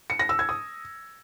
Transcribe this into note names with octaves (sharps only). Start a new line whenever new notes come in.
C#7
A#6
E6
G#6
D#6